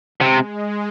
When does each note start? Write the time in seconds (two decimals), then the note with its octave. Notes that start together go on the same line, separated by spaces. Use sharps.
0.21 C3 G#3